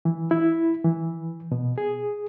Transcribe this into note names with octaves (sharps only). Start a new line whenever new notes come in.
E3
E4
E3
B2
G#4